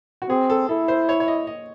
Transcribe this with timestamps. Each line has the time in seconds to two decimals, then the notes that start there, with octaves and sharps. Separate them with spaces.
0.22 F#4
0.29 C4 G#4
0.50 A4
0.69 E4 A4
0.88 C5
1.09 C#5
1.20 C#5
1.28 D#5
1.47 D#5